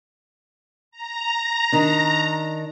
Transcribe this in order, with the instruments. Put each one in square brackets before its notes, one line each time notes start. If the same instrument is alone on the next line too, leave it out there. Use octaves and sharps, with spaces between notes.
[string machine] A#5
[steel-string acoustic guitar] D#3 D4